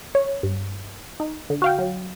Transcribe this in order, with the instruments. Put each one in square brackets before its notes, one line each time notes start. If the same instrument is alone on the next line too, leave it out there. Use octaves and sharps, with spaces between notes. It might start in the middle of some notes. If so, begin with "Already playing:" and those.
[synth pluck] C#5
G2
D#4
D3
F#4 F5 G5
F#3